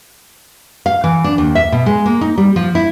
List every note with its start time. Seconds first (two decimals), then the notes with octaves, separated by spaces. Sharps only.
0.86 F5
1.04 E3
1.24 D4
1.38 D#2
1.55 E5
1.72 B2
1.86 G#3
2.06 A#3
2.21 D#4
2.38 G3
2.56 F3
2.75 E4